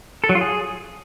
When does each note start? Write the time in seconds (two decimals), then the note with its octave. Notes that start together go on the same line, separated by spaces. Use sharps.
0.24 A4
0.29 F#3
0.35 F4
0.41 G#4